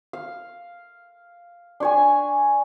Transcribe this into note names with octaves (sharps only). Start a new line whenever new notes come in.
F5
D4 C#5 G#5